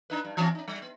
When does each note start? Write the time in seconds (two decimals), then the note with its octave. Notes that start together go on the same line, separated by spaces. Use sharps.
0.10 D4 D#4 B4
0.25 G2
0.37 E3 C4 C#4
0.55 C#4 D#4
0.68 G3
0.82 B3